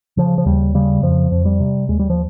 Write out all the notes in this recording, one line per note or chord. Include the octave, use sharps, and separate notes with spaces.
C#3 F3
F3
D#2 G3
C#3 G3
F2 F3
F2
G3
C3
D#2 G#3
G3
F3